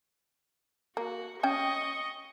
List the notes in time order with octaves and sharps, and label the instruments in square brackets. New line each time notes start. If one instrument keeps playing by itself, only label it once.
[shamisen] A#3 [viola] F#4
[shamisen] C#4 G5 [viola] D#5 C#6